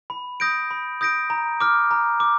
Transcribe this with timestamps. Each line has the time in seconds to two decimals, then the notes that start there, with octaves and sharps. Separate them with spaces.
0.10 B5
0.40 D#6 G6 A#6 D7
0.71 B5
1.01 D#6 G6 A#6 D7
1.30 A#5
1.61 D6 F6
1.91 A#5
2.20 D6